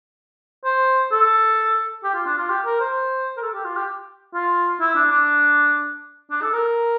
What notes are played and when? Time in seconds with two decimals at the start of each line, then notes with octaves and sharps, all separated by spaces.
0.65 C5
1.12 A4
2.04 G4
2.15 F4
2.26 D4
2.38 F4
2.50 G4
2.65 A#4
2.80 C5
3.37 A#4
3.42 A4
3.54 G4
3.65 F4
3.77 G4
4.34 F4
4.81 E4
4.96 D4
5.11 D4
6.31 D4
6.42 A4
6.53 A#4